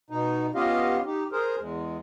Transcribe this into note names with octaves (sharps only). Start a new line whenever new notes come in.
B2 D#4
B3 C#4 F4 G4 D#5 F5
D#4 G4
G#4 A#4 C5
E2 G#3